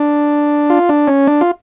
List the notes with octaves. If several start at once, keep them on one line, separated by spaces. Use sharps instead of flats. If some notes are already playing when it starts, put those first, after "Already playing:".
Already playing: D4
F4
D4
C#4
D4
F4